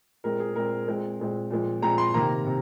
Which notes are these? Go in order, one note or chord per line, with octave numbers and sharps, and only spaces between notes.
A#2 G#3 C4 A#4
G#4
A#2 G#3 C4 A#4
A#2 G#3 C4
A#2 G#3 C4
A#2 F3 G#3 C4
A#2 F3 G#3 C4 A#5
C6
C3 D#3 A#3 A#5
C3